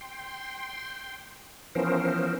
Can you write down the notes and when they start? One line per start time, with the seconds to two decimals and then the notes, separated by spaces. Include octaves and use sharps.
0.01 G5 C6
1.75 E3 F3 B3 C#4 A#4 C5